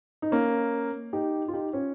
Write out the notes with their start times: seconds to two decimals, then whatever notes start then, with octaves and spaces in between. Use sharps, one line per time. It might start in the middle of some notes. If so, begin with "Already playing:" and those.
0.22 D#4
0.31 A#3 C#4
1.13 D#4 G4
1.48 F4
1.53 D#4 G4
1.73 C#4 F4